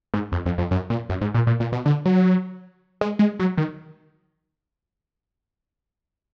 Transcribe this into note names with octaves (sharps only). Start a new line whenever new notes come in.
G#2
F2
F2
F2
F#2
A#2
F#2
G#2
A#2
A#2
A#2
B2
D3
F#3
G#3
G#3
F#3
D#3